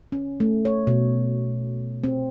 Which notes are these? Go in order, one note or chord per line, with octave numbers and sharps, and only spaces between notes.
C#4
A3
C#5
B2
C4